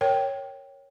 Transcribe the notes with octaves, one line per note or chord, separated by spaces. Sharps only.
A#4 C#5 G5